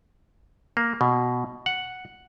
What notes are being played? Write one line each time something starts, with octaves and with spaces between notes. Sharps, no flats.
A#3
B2
F#5